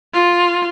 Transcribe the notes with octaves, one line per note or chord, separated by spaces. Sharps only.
F4